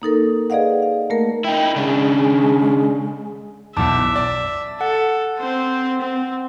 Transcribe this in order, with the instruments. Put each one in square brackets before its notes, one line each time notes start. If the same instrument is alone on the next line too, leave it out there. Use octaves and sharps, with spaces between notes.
[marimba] A#3 D#4 A4 A#4
G#4 B4 D5 D#5 F5 F#5
F5
A3 A#3 A#4
[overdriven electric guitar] D#4 E4 [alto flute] G5
[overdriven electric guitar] C#3 D4 [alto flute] G#3
[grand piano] B1 E2 [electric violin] E5 [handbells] A5 D6
[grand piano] D5
[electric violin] A4 [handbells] F#5
[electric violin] C4 C5
C4